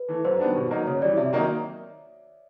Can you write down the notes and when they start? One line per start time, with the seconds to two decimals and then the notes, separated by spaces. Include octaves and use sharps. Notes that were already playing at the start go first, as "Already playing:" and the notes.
Already playing: B4
0.09 E3 A3
0.25 F#2 C5
0.39 D#3 G3 B3 D4
0.56 B2
0.71 F#3 A#3 D#4
0.87 C#3 C#5
1.02 E3 G3 D5
1.17 C3 E5
1.33 D#3 F#3 A#3 D#4